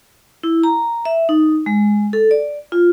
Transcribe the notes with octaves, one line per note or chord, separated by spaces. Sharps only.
E4
A#5
E5
D#4
G#3
A4
D5
F4